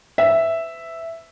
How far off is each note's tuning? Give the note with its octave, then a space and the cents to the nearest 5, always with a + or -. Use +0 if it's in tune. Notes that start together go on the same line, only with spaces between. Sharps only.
B4 +40 E5 +0